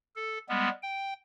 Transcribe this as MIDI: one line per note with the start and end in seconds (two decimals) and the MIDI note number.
0.16 0.38 69
0.49 0.69 55
0.49 0.69 56
0.49 0.69 59
0.82 1.13 79